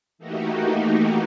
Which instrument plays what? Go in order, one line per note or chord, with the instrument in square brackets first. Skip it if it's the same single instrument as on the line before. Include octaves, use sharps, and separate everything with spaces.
[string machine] E3 A3 A#3 D#4 F#4 G4